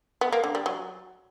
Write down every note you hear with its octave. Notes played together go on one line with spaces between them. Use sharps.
B3
A#3
D3
G3
F#3